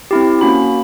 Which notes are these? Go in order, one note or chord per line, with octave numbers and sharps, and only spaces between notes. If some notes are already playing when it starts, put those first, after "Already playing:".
C4 E4 G4
A#3 C#4 F#4 B5